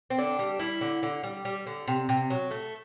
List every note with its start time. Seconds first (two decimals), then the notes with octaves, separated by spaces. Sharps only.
0.10 C4
0.18 D3 D4
0.39 G3
0.59 G3 E4
0.81 D3
1.03 D3
1.23 G3
1.45 G3
1.67 D3
1.88 C3
2.09 C3
2.30 F#3
2.51 A3